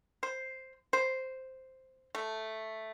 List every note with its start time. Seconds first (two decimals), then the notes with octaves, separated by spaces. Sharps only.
0.23 C5
0.93 C5
2.15 A3